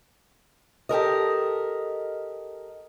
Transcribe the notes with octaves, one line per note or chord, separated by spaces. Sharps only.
G4 A4 A#4 D#5